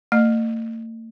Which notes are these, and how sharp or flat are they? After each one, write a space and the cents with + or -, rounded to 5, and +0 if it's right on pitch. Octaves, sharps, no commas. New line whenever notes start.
A3 +45 D#5 -35